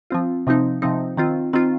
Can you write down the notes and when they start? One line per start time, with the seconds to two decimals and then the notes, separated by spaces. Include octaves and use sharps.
0.11 F3 C4 F4
0.47 C3 F3 C4 D#4
0.82 C3 F3 C4 D#4
1.17 D#3 C4 F4
1.53 D#3 C4 F4